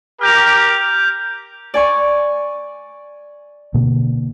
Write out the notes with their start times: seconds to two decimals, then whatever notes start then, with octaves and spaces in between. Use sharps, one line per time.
0.21 G4 A#4 F6 G6 F7
1.74 D5 G#5 C#6
3.74 B2 D3 A#3